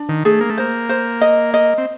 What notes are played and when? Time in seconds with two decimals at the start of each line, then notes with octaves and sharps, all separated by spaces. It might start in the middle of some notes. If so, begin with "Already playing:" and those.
Already playing: D4
0.09 D#3
0.25 A3 G#4
0.41 A#3
0.50 A3
0.57 A#3 C5
0.89 C5
1.21 D#5
1.54 D#5
1.78 C4